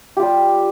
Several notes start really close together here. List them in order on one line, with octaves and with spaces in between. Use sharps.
G4 F4 G3